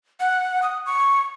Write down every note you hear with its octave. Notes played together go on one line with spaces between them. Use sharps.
F#5
D#6
C#6